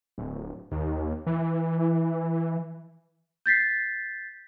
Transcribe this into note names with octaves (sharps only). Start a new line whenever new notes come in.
D1
D#2
E3
G6 A6 B6 C7